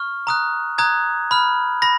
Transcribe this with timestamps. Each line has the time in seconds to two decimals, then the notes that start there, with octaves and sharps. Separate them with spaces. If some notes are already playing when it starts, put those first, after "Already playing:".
Already playing: C#6 F6
0.27 A#5 D#6 F#6
0.78 A#5 D#6 F#6 G#6
1.31 B5 F6
1.82 B5 A#6